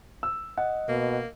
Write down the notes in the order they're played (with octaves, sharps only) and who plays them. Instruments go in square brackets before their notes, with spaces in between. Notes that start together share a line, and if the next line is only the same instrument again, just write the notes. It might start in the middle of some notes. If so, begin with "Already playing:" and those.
[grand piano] E6
[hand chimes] D#5 [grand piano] F#5
[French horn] B2 [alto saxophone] A#3